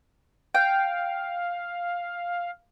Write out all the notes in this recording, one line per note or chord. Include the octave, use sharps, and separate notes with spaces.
F5 G5